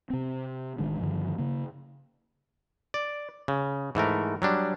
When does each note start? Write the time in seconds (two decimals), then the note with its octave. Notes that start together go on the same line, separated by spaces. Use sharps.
0.10 C3 C4
0.78 A1 D#3 G#3 D4
1.00 G2 D3 D#3 F3
1.38 C#3 A#3
2.94 D5
3.48 C#3
3.95 G#2 E3 A3 A#4
4.42 F#3 G3 D4